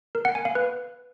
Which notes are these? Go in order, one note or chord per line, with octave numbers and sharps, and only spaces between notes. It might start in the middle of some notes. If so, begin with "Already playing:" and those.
A#4
F#5
G#5
F5
B4